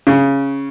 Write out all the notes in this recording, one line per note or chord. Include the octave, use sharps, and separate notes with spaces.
C#3